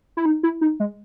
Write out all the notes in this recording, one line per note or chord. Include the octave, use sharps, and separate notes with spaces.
E4
D#4
E4
D#4
G#3